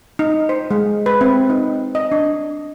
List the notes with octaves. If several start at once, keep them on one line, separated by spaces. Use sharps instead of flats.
D#4
C5
G#3
B4
C4
D#4
D#5
D4